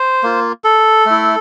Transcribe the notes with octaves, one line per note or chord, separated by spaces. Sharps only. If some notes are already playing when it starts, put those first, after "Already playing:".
Already playing: C5
A#3 F4
A4
A3 E4